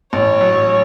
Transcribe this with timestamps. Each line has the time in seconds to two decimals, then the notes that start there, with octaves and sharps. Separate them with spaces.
0.13 A1 C#5
0.41 F#3